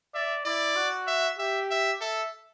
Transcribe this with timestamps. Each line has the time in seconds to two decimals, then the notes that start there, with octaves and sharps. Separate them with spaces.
0.14 D5 E5
0.45 E4 D5
0.76 F#4
1.07 E5
1.39 G4 E5
1.70 E5
2.01 A4 E5